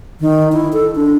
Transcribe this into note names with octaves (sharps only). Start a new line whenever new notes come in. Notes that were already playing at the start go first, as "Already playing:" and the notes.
D#3
E4
A4
D4